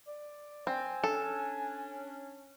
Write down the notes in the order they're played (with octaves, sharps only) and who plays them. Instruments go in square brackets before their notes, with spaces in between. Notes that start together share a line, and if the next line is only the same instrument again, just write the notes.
[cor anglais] D5
[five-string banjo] C4 [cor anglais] G#5
[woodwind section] C#4 D4 [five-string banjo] A4